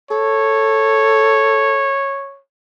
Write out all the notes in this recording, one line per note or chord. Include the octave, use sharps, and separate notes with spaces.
A4 C#5